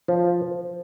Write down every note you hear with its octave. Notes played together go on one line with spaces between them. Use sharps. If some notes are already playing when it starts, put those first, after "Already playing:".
F3